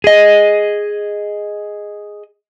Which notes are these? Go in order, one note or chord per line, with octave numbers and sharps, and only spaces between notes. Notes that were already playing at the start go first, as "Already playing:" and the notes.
G#4 D#5